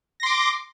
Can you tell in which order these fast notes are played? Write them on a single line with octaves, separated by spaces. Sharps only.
A#6 C6 D6